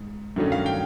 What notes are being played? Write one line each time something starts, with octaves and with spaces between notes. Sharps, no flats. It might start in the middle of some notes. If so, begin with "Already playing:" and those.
Already playing: G#2
G2 D#3 F#3 A3 C#4
F5
G5